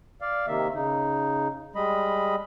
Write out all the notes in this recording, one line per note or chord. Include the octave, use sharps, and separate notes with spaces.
D5 F5
C3 D#3 A#3 E5
C#3 D#4
G3 G#3 D#5 B5